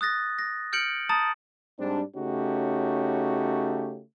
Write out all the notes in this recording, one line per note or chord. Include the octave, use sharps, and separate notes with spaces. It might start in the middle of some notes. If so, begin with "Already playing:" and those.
D#6 F#6 A6 A#6
A#6
F6 G6 C#7 D7 F#7
A5 A#5 D#6 A6
G#2 G3 C4 D4
C#3 A3 C#4 D#4 F#4 G4